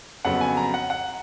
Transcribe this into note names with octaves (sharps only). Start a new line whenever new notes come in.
F2 C#3 F#3 B3 F#5
G#5
A#5
F#5
F#5